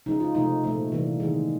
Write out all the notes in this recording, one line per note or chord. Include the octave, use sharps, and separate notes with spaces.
C#3 F3 G#3 D#4
F4
C3 F3 A3 D#4
A#2 F3 A3
C3 E3 G3 A#3
D#3 G#3